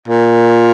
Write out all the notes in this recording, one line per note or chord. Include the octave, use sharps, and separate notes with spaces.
A#2